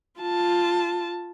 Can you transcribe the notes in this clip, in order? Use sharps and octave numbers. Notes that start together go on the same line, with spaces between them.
F4 A5